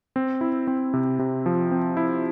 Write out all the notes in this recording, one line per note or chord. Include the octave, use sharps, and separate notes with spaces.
C4
E4
C4
C3
C3
F3
C4
E4